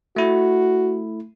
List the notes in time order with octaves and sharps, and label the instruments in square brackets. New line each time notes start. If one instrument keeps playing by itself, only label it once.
[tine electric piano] A3 E4 [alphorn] F#4